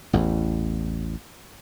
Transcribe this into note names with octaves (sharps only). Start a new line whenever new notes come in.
A1 E2